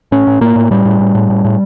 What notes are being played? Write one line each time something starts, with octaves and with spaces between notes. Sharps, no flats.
A2 C#4
A2
A2 A#3
A2
A2 G3
A2
A2
A2
A2
A2